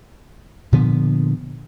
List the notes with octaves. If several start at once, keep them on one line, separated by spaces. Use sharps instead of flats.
A#2 D3 F3 B3